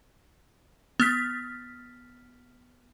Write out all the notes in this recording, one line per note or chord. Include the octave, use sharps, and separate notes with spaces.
B3 F6 B6